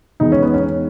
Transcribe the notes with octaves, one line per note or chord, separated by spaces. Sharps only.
E2 D#3 G#3 B3 D#4
C#4
B3
C#4